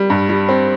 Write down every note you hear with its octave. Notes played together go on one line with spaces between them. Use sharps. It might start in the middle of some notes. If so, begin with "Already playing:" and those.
Already playing: G3
G2
G3
C4